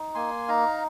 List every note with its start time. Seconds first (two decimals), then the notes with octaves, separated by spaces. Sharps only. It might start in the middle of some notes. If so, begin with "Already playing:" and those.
Already playing: D#4
0.15 A#3 G#5 C6
0.48 D#4 F5 A#5